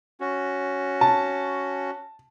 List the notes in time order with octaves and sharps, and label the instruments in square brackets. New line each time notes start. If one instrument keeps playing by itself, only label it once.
[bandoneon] C#4 F#4
[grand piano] A5